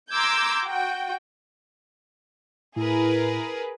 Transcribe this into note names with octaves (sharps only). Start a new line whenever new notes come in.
A#5 C6 D6 E6 G6 G#6
F#4 G5
A2 E4 G#4 A#4 B4